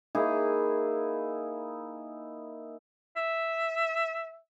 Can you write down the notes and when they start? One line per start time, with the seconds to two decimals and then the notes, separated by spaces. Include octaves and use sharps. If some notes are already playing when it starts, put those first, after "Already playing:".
0.15 A#3 D#4 E4 G#4
3.16 E5